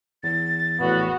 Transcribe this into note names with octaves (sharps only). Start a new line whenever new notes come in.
E2 A6
A#1 E2 A2 B3 F#4